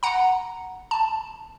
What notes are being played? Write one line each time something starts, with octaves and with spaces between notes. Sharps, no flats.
F#5 A#5
A5